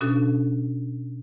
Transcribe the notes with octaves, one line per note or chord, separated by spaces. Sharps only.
B2 C#4 D4 F#4 A4